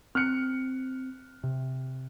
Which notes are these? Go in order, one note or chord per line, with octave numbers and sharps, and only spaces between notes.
C4 F6 F#6 C#7
C3